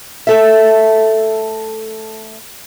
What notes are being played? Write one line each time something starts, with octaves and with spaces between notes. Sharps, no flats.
A3 A4 E5